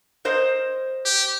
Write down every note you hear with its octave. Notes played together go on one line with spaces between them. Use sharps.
A#4 C5 D#5
G4